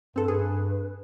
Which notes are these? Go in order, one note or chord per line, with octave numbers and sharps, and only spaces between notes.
G2 C4 A4 B4
G2 G#4 B4